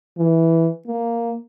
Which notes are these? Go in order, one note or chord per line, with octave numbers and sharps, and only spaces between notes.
E3
A#3